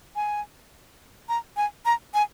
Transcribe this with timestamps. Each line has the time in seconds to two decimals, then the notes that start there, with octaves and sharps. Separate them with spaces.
0.16 G#5
1.29 A#5
1.57 G#5
1.85 A#5
2.14 G#5